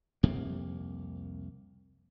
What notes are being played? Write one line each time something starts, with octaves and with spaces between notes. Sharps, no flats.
C2 F2 C3 A#3